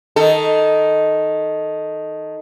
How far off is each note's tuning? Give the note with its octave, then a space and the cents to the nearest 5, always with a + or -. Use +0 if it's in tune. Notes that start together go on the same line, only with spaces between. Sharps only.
D#3 +0 A4 +5